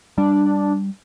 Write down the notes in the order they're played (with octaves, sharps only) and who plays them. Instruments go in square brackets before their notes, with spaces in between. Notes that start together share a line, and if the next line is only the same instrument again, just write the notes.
[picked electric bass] G3 [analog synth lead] D4